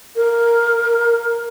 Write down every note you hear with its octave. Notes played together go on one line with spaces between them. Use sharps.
A#4